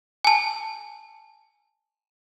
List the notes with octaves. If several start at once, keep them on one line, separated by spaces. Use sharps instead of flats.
G#5 A5